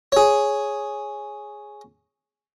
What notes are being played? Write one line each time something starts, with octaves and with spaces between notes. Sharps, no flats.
G#4 C#5